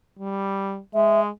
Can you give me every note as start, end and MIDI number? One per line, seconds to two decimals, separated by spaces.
0.19 0.80 55
0.94 1.30 56
0.94 1.20 76